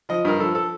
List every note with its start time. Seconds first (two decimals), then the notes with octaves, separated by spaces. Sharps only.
0.09 F3 D#5
0.25 G2 A#4
0.39 F3 A4
0.55 A4